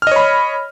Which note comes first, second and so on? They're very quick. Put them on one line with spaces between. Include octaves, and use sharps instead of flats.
F6 D#5 C#5 B5